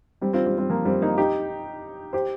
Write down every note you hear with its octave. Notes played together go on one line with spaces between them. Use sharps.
G3 C4
C4 F4
G3 C4
G3 C4
F3 A#3
G3 C4
A#3 D#4
D#4 G4
G4 C5